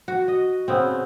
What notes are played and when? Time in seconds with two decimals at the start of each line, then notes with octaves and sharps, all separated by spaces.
0.08 F#4
0.28 D#5
0.68 C#3 B3 C4